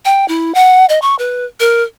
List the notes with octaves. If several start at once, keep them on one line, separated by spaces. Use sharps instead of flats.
G5
E4
F#5
D#5
C#6
B4
A#4